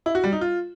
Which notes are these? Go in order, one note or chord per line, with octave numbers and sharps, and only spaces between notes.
E4
F#4
G3
D#4
F4